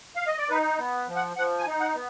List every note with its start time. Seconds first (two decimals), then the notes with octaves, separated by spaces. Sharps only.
0.16 F5
0.27 D#5
0.38 D5
0.50 D#4 B4
0.78 B3
1.08 F3
1.16 F#5
1.37 F3 F#5
1.59 G#5
1.67 D#4
1.81 F#5
1.95 B3